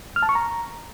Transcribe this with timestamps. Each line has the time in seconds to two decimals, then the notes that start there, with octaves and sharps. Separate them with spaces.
0.16 F6
0.23 A5
0.29 C#6
0.35 A#5